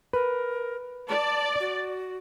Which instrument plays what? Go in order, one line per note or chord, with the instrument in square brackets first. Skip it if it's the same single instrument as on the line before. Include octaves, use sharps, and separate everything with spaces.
[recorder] A#4 [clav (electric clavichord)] B4
[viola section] D5 [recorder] A5
[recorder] F#4